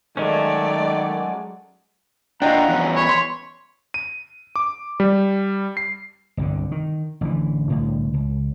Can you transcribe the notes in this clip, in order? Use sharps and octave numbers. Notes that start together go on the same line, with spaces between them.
D#3 F#3 G#3 A3 C#4 D5
D4 F4 D#5 F#5 G5 A#5
E2 C#4
C#5 B5
C6
D#7
D6
G3
C7
G1 C2 D3
D#3
A1 D3 E3
C2 A2 D3
C#2